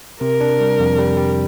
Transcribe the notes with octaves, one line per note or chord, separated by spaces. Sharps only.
C3 A#4
D4
G3
F2
G3
G3